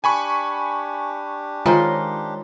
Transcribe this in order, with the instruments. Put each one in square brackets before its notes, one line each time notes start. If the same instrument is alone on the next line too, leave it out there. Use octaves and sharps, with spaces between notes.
[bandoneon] D4 G4 [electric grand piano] G#5 B5 C#6
[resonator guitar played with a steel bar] D#3 C5 [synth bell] G#3 F4 C#5